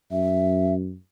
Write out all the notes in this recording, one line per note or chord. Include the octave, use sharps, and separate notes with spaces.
F#2 E5